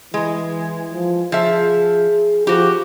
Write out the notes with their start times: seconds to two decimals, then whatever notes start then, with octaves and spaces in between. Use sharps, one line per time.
0.14 E3 G#3
0.92 F3
1.32 F3 G#4 E5
2.47 F3 F#4 G4